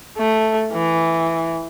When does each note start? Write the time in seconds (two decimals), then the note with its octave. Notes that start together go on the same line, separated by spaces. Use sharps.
0.18 A3
0.73 E3